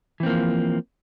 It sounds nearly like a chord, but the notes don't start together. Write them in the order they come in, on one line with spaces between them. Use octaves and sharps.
E3 C4 A#3 F3